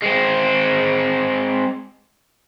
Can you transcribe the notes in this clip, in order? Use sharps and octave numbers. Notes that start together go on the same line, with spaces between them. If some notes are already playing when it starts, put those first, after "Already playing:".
G#3 C4